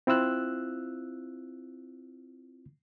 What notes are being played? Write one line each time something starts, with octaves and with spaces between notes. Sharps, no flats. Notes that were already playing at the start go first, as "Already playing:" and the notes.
C4 E4 F4 E6 F#6